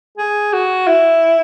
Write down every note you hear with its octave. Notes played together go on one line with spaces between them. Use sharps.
G#4
F#4
E4